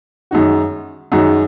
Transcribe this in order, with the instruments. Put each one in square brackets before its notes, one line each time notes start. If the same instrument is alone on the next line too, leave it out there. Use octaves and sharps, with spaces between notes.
[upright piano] F#2 D#3 G#3 D#4 F#4
F#2 D#3 G#3 D#4 F#4